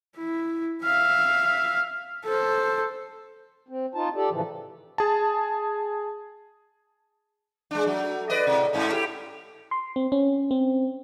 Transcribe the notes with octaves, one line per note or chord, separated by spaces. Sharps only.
E4
E5 F5
A4 C5
C4
D#4 F4 A5
G4 A4 D5
A2 C#3 E3 F3
G#4 A5
G#3 D4
F#3 A3
B4 D5 D#5
A2 C3
G#2 A3 C#4
E4 G4
C6
C4
C#4
C4